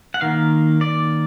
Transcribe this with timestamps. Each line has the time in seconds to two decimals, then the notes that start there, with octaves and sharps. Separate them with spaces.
0.14 F#5
0.21 D#3 A#3 F5
0.81 D5